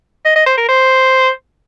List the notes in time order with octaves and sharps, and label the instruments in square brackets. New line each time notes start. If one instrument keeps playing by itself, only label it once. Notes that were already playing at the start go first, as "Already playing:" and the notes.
[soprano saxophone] D#5
D#5
C5
A#4
C5